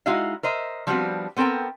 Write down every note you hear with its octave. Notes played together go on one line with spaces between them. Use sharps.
G#3 D#4 E4 F#4 D#5 F5
A#4 C5 D#5 E5
F3 G3 B3 C4 D4 F#4
B3 C4 A4 A#4 G5